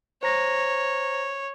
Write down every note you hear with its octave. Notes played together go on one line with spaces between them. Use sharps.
C5 C#5 A#5 A#6